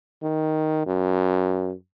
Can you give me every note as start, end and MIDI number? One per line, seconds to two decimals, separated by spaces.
0.22 0.84 51
0.86 1.72 42